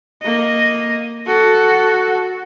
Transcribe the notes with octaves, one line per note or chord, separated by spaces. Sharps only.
A#3 D#5
F#4 A4